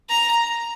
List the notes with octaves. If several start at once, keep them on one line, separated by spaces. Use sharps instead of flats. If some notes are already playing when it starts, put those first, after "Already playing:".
A#5